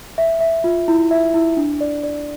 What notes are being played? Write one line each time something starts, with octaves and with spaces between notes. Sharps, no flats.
E5
E5
F4
E4
E5
E4
D4
D5
D5